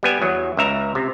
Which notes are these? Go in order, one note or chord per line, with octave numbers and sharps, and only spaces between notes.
G3 B3 G#5
E2 F#3
C#2 E5 A#5
C3